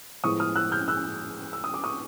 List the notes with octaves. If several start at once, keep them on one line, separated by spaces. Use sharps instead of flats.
A2 F3 G#3 B3 C#6 D#6
D#6 F6
E6 F#6
F6 G6
E6 F#6
E6
D#6
D6
C#6 D#6